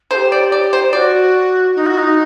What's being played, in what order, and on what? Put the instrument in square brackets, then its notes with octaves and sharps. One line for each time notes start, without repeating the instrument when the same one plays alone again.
[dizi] A4 [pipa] C5
[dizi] G4
[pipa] D5
D5
C5
[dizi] F#4 [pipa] D5
[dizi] D#4
F#4
D#4